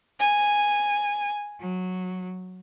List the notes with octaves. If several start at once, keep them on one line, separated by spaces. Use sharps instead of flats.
G#5
F#3